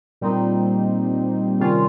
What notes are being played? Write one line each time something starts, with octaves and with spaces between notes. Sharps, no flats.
A#2 G3 C4 D#4
C3 D#3 G3 C#4 F4